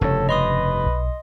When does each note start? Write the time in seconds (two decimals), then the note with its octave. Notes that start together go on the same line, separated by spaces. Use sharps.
0.01 F1 G2 C#3 A4 C#5
0.29 B4 D#5 C6 D#6
0.86 B1